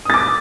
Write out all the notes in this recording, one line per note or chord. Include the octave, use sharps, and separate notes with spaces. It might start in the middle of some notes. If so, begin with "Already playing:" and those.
D6 D#6 A6